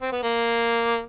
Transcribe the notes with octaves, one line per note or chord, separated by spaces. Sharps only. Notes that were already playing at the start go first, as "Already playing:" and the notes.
C4
B3
A#3